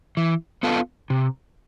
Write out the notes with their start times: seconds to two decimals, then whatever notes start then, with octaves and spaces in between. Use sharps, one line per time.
0.17 E3
0.63 B3 F4 A4
1.10 C3